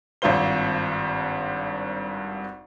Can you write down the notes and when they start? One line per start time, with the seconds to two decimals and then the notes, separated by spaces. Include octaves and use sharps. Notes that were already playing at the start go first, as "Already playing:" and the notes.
0.22 G#1 G2 C4 F4 C5 G7